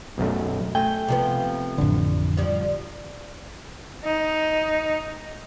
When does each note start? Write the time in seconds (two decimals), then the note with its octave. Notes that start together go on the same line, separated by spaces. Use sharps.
0.18 B1 F#2 A3
0.75 A3 G5 G#5
1.08 C3 F3 B3
1.78 A1 F2 D3
2.37 F3 G3
4.04 D#4